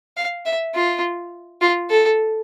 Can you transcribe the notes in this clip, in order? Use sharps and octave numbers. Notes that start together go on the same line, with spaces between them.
F5
E5
F4
F4
A4